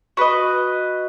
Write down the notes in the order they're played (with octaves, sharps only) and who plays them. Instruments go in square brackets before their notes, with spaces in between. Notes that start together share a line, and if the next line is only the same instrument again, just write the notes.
[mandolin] F#4 B4 D#5